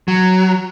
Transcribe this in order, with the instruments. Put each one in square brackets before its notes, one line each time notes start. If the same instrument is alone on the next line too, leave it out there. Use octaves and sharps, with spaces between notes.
[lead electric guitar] F#3